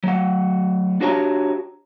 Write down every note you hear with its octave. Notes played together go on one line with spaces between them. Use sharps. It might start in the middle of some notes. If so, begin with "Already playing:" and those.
F#3 A3 F#5
D4 F#4 G4 C#5 A5 A#5